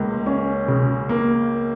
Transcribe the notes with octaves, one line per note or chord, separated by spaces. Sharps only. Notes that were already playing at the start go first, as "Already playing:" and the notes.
Already playing: C#2 C#3 A#3
C#4
C#3
A#3